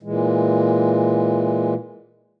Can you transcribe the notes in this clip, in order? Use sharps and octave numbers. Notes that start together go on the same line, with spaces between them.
A#2 E3 G#3